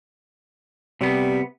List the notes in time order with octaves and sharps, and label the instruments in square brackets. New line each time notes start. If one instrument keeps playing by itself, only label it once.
[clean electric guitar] C3 B3 [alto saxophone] G3